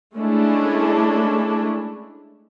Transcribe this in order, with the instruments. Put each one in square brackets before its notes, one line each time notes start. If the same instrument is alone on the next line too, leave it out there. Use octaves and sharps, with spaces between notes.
[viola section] G#3 A3 C#4 D4 E4